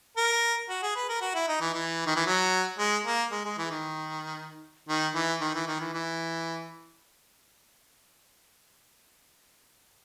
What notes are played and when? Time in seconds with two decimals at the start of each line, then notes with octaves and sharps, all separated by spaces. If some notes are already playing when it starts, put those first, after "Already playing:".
0.17 A#4
0.69 F#4
0.82 G#4
0.96 B4
1.09 A#4
1.21 F#4
1.35 E4
1.48 D#4
1.61 E3
1.74 E3
2.06 D#3
2.16 E3
2.26 F#3
2.78 G#3
3.05 A#3
3.32 G#3
3.45 G#3
3.58 E3
3.71 D#3
4.89 D#3
5.15 E3
5.41 D#3
5.55 E3
5.67 D#3
5.80 E3
5.94 E3